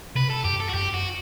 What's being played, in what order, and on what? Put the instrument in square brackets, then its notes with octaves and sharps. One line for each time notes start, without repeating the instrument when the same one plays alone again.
[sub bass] C3 [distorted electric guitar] B4
[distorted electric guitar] A4
[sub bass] F#2 [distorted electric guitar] G4
[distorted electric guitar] A4
F#4
[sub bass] F#2 [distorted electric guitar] G4
[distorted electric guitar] F#4